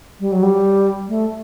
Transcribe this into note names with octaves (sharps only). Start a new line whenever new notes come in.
G3
F#3
G3
A3